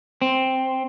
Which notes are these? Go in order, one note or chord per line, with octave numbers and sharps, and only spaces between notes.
C4